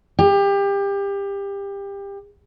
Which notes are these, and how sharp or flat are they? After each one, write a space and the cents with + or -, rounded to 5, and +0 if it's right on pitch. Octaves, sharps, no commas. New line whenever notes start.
G4 +25